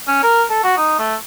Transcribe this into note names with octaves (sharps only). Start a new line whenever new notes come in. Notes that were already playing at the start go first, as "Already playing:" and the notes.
C#4
A#4
A4
F#4
D#4
A3